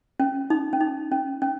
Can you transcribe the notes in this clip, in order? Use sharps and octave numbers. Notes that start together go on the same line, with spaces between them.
C#4
D#4
C#4
D#4
C#4
C#4